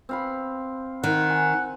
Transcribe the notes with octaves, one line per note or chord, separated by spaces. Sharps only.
C4 F5 B5
D#3 F#5
G#5